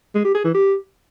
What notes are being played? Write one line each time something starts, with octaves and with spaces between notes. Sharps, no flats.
G#3
G4
G#4
E3
G4